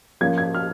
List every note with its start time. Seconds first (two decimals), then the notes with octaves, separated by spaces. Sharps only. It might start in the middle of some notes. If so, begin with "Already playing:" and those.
0.21 F3 A#3 C#4 F4 G#6
0.38 G#6
0.54 F6